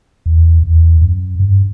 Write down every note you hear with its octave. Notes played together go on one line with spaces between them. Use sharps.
E2
E2
F#2
G2